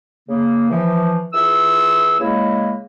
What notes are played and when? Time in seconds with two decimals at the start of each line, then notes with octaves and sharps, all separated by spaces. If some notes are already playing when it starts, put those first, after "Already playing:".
0.28 C#3 A#3
0.71 E3 F3
1.34 E3 F4 G#4 E6
2.20 C#3 G#3 A#3 E4